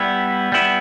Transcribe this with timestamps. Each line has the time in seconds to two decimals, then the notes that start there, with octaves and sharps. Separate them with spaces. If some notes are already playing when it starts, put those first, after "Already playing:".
Already playing: G3 B3 E4
0.52 G3 B3 E4